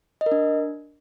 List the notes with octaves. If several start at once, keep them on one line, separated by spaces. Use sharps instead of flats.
D#5
A#4
D4